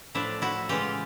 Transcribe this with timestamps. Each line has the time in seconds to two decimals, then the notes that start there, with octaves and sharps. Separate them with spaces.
0.15 A2 F3 A3 D4 E4
0.42 E4 F#4
0.69 C#3 E3 G#3 F4 G4